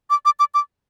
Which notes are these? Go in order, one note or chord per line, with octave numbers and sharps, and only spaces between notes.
D6
D6
D6
D6